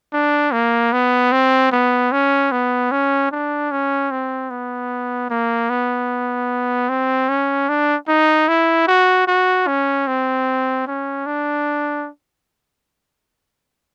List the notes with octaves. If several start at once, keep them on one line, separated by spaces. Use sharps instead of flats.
D4
A#3
B3
C4
B3
C#4
B3
C#4
D4
C#4
C4
B3
A#3
B3
C4
C#4
D4
D#4
E4
F#4
F#4
C#4
C4
C#4
D4